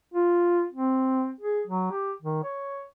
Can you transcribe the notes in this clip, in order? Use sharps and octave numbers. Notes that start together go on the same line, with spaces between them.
F4
C4
G#4
F#3
G4
D#3
C#5